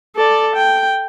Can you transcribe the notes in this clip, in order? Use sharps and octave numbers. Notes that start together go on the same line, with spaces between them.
A4 D5
G5